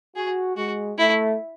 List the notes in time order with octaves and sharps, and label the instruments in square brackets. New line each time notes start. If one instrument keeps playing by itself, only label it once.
[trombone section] F#4 [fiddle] G#4
[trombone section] G#3 [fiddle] F#4
[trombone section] A3 [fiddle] E4